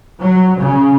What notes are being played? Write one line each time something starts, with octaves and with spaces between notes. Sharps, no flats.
F#3
C#3